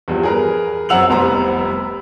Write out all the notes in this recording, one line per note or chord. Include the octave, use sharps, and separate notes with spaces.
E2 G2 F3
G#4 A#4 B4
F#2 C4 F#5 E6 F7 F#7
F1 C2 B3 C5 A#5